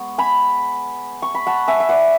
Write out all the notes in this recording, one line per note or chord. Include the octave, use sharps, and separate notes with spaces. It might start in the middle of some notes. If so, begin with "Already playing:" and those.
Already playing: G#3 B3 C#6
G#5 B5
C#6
B5
F#5 A5
E5 G#5
E5
D5 F#5